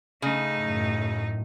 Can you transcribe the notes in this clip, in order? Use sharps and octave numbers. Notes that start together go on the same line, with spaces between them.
C#3 A3 D#4
F#2 A2